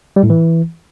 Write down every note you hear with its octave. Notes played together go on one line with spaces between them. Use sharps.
G3
A2
E3